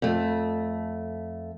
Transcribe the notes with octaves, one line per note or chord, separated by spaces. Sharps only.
F2 A3